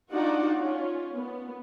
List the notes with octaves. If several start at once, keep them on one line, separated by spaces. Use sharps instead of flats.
D4 D#4 F4 F#4 D5 F#5
C#4 F4
B3